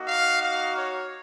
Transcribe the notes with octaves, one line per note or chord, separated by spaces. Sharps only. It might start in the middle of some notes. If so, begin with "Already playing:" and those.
Already playing: A#3 D#4 F#4
F5
F5
C#5